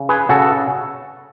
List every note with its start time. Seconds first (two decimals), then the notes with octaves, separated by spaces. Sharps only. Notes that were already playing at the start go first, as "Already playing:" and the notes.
Already playing: C#3
0.09 G#4 B4
0.29 C#3 F#4 A4